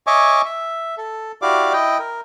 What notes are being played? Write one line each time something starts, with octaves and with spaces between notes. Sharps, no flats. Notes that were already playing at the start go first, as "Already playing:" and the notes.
C#5 D#5 E5 G#5 C#6 D6
E5
A4
E4 F#4 G4 D5 F5 D6
E4 D#5 G5
A#4